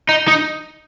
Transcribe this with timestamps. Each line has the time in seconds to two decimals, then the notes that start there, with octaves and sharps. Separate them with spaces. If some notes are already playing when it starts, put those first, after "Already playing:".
0.09 D#4
0.28 D#4